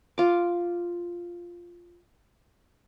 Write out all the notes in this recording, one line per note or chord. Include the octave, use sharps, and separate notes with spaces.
F4 D6